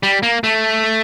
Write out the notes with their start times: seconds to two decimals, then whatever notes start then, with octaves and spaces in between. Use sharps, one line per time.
0.03 G3
0.23 A#3
0.44 A3